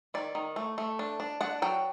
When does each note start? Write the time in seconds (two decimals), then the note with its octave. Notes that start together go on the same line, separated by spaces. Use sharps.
0.14 D#3 D5
0.35 D#3
0.56 A3
0.78 A3
0.99 D4
1.20 D4
1.41 D4 F#5
1.62 F#3 G5